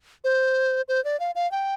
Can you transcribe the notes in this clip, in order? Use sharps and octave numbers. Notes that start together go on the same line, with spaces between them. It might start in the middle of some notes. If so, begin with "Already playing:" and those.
C5
C5
D5
F5
F5
G5